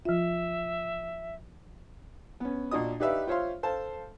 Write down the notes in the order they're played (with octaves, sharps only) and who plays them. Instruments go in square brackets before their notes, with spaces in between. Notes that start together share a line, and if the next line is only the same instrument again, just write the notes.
[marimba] F3 F4 [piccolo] E5
[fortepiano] B3 C#4
A#2 D4 F#4 D#5 D#6
D#4 G4 B4 D5 E5 F5
F4 C5 C#5 E5 F5 C6
A4 C5 F5 A5